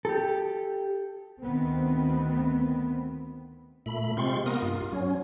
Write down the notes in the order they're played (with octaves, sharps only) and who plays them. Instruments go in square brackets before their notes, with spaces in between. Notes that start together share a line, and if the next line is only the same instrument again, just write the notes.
[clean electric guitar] G4 A4
[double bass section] D2 D#3 B3 C4
[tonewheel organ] A#2 A3 B5
C3 G#3 C4 F4 C6 C#6
A#3 B3 A#4 D#6
G2 F4
F#3 C#4